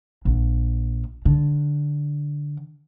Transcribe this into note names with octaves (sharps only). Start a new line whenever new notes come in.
A#1
D3